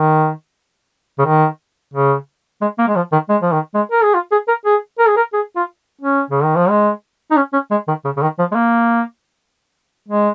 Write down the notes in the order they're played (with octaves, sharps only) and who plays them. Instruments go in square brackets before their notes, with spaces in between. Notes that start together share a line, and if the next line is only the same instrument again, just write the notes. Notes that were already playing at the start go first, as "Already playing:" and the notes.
Already playing: [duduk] D#3
C#3
D#3
C#3
G#3
A#3
G#3
F3
D#3
G#3
F3
D#3
G#3
A#4
G#4
F4
G#4
A#4
G#4
A#4
G#4
A#4
G#4
F4
C#4
C#3
D#3
F3
G#3
D#4
C#4
C#4
G#3
D#3
C#3
C#3
D#3
F3
G#3
A#3
G#3